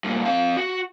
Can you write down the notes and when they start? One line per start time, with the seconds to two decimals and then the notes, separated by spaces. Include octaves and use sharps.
0.04 G2 A#2
0.26 C4 F5
0.57 F#4